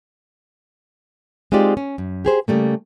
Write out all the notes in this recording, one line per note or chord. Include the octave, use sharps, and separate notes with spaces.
G#3 C4 D#4 F4 G4 D5
C#4
F#2
G4 G#4 C5
C#3 G3 A3 A#3